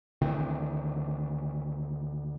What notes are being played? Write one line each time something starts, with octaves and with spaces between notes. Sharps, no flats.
D2 D#3 E3 C4